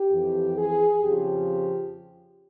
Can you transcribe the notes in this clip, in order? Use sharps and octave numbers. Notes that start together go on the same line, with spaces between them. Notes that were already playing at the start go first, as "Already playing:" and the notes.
Already playing: G4
F2 E3
G#4
F2 C#3 F3 G4